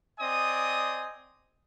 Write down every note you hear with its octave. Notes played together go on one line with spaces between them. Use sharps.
C4 D5 D#5 G#5 D#6